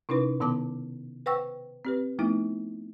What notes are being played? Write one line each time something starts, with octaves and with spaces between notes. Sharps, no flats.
C3 C#4 D#4 E4 B4
B2 D#3 B3 A5 D6
B4 C5 F#5 G5 C#6 E6
C4 G4 B4
F3 A3 B3 D#4 E4